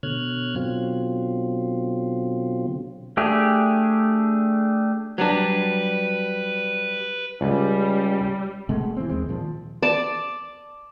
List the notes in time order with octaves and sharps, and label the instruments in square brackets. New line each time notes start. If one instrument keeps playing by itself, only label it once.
[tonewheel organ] B2 D3 C#5 F6 F#6 G#6
B2 D3 F#3 C4 F4
[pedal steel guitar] A3 D4 G4 G#4
[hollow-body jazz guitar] F#3 G3 D4 [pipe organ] B4
[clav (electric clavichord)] C#2 [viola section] G3
[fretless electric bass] B2 G#3 A3
E3 C4
D#2 G#3 C4
A#2 D#3 F3
[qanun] D5 A5